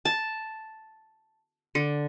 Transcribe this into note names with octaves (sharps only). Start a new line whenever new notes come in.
A5
D3